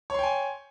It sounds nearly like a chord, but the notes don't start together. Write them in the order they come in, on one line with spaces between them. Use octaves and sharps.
C#5 C6 G5 G#5